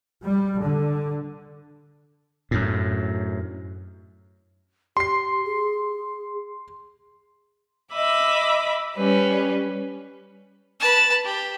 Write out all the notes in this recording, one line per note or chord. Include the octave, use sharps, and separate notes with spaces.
G3
D3
F#2 A2
G4 C6 C7
G#4
D#5 E5 B5 D6
G3 C#4 B4
B4 A5
G4